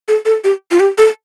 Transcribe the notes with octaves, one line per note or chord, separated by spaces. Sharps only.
A4
A4
G4
F4
G4
A4